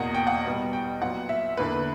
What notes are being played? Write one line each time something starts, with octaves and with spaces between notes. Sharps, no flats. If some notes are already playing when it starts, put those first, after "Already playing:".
Already playing: E2 B2 A#3 F#5
G5
F#5
B2 G3 B3
G5
A#2 F#3 B3 F#5
E5
E2 D3 A#3 B4